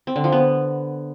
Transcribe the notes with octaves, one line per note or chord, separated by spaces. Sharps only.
C4
D3
F3
B3